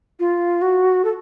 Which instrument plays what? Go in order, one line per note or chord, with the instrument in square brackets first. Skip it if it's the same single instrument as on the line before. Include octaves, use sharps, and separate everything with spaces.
[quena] F4
F#4
A4